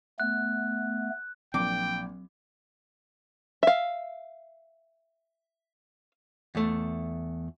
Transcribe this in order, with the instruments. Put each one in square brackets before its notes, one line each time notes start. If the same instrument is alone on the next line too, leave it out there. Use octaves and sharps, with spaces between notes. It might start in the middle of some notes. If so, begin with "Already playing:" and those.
[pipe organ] A3 B3 [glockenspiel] F#6
[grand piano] A#1 A#3 [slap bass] F#3 C4 [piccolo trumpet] G5 [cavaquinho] D6
[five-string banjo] E5 F5
[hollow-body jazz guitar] E2 A3